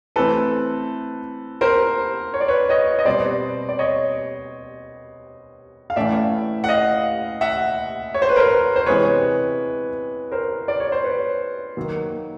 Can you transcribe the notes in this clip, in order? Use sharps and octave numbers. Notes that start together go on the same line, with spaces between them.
E3 A3 C4 A4 B4
A#4 C5
C#5
D5
B4 C#5
C#5 D#5
D#5
B2 G3 C4 C5 D5
D5
C#5 D#5
F5
A2 E3 A3 C#4 D5 E5
F#5
D#5 F5
E5 F#5
C#5
C5
B4
A#4 C5
C5
C3 E3 G#3 B3 B4 C#5
A#4 C5
D5
C#5
C5
B4 C#5
D#3 F#3 A#3